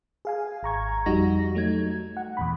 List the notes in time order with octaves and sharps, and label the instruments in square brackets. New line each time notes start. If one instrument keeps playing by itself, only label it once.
[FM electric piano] G#4 F5 G#5
G#1 A#5 C#6 G#6
F2 G3 D#4 F#4 A#6
F#3 A3 D#4 G#6
F#5
E2 A#2 B5